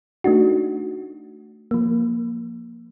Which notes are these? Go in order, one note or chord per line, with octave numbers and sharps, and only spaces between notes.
A3 D4 D#4 F#4
F3 A#3